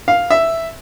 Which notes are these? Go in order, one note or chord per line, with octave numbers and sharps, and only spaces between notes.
F5
E5